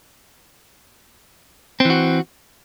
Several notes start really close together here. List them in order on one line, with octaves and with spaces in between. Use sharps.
C4 E3 F#4